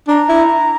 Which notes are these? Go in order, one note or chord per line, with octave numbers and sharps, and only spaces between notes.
D4 A#5
E4